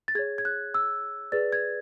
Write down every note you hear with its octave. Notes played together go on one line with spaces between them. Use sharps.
A6
G#4 C#5 G#6
G#6
F#6
E6
G#4 B4 D5 A6
G#6